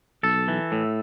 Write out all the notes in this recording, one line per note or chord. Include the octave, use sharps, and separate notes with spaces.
B1 A4
E3
A2